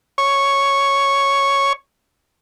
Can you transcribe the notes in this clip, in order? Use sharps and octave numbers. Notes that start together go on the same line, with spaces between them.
C#5 C#6